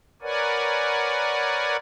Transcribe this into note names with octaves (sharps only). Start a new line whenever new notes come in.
A#4 B4 C#5 D5 F#5 G#5